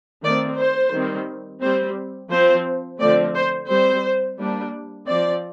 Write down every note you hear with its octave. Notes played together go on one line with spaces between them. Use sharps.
D#3 A3 C4 D5
C5
D#3 G3 C4
G3 C4 C5
F3 C4 C5
D3 F3 A3 C4 D5
C5
G3 C4 C5
G3 A#3 D4
F3 C4 D5